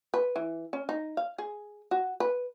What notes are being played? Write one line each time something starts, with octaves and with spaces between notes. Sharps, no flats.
B4
E3
C#4
D#4
F5
G#4
F#4
B4